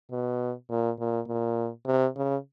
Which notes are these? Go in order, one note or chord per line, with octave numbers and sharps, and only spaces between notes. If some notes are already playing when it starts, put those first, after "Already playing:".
B2
A#2
A#2
A#2
C3
C#3